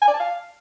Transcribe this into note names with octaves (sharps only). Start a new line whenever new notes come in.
G#5
D5
A5
F5